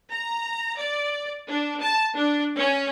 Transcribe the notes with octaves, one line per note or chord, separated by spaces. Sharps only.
A#5
D5
D4
A5
D4
C#4